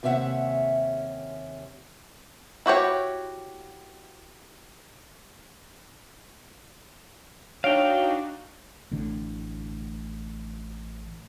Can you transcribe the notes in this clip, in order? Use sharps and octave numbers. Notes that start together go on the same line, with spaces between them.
D#2 C3 C#4 E5 F#5
E4 F#4 G4 C#5
D4 D#4 F#4 C#5 F5 G5 D7 F7
A1 A2 D3